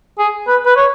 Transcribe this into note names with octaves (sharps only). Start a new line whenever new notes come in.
G#4
B4
B4
C#5